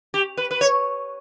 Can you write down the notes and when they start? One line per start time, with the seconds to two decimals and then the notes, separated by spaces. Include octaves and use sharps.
0.14 G4
0.37 B4
0.51 B4
0.61 C#5